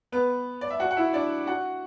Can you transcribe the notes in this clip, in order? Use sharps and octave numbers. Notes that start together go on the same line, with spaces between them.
B3 B4
D5
E5
F#4 F#5
F#5
E4 E5
D4 D5
F#4 F#5